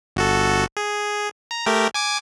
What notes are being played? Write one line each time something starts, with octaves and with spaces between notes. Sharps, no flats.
G1 F#4 A4
G#4
A#5
A3 G4 A#4
G#5 D6 G#6